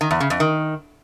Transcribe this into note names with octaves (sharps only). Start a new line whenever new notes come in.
D#3
E2
C#3
F2
D#3